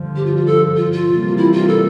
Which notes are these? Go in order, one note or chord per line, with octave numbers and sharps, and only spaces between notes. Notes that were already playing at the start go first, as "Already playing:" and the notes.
Already playing: G2 D3 F3
G4
F4
F4
A4
F4
F4
C3 E3 G3 A#3
E4
F4
A4